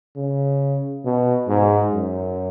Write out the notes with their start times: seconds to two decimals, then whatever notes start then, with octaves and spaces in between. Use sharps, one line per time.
0.16 C#3
1.05 B2
1.48 G#2
1.93 F#2